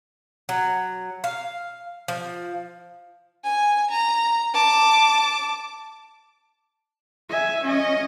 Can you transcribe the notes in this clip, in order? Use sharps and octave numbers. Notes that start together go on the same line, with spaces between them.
F#3
F5
F3
G#5
A#5
A5 D6
E5 G#5
C#4 D#5